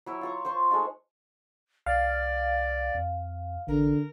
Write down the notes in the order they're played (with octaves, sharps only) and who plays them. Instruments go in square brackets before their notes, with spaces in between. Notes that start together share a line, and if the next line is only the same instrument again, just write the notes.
[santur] F#3 E4 C#5
F4 A#5 C#6
C5 C6 C#6
G#3 A3 D#4 F4
[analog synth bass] C2 [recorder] D5 [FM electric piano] F5
[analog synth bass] F2
[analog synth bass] A1 [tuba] D3 [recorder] A#4